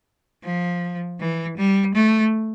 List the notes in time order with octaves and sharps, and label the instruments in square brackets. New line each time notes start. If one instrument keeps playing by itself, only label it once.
[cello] F3
E3
G3
A3